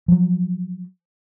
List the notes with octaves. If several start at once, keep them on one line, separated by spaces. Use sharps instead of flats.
F3 F#3